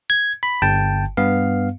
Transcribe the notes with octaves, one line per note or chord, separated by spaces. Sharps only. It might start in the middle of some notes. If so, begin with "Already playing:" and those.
G#6
B5
G1 G5 A5
G2 B3 F5